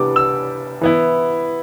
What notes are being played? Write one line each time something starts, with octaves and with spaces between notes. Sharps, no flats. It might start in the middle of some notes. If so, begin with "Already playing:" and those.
Already playing: C3 E3 G3 B3 D4 D6
E6
E3 B3 E4